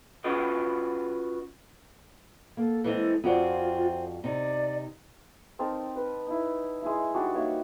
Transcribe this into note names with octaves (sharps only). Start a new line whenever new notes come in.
C#4 F4 F#4 B4 D#5
A#3 A4
E3 G#3 C4 A4
F2 C4 F4 F#4 G#4 D5
C3 D#4 D5
C4 D#4 A#4 A5
B4
D#4 E4
G#3 E4 E5
G3 D4 D#4 F#4
A#3 D#4 C#5 E5